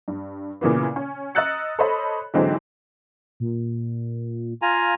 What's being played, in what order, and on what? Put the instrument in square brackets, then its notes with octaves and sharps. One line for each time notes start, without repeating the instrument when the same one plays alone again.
[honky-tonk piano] G2
A#2 C#3 E3 A#3 B3
C#4
D#5 A#5 E6 F#6 A6 C#7
A4 C5 C#5 D#5 B5
G#2 D3 E3 F#3 G#3 C4
[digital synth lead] A#2
[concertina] F4 G#5 A#5 [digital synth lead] F5